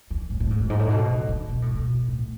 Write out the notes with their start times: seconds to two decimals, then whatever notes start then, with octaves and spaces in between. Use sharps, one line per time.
0.11 E3
0.30 A2
0.40 A2
0.50 G#2
0.60 F#2
0.70 G#2
0.79 A2
0.90 B2
1.09 C#3
1.29 D3
1.49 B2
1.62 A2
1.74 B2
2.08 A2